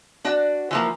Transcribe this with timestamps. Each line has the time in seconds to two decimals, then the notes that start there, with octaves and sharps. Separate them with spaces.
0.25 D4 F#4 D5
0.71 E3 F3 A#3